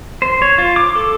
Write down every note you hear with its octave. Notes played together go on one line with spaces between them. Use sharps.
C5
C#5
F4
D6
A4